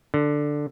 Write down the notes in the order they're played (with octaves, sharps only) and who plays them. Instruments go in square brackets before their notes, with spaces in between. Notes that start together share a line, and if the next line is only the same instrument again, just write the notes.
[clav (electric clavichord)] D3